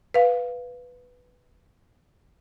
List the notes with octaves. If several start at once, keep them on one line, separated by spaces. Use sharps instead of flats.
B4 F5